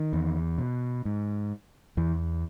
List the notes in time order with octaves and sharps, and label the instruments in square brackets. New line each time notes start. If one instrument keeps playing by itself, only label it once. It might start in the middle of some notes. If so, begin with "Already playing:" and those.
Already playing: [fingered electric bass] D#3
E2
B2
G#2
E2 E3